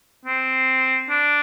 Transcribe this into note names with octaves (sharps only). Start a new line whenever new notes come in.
C4
D4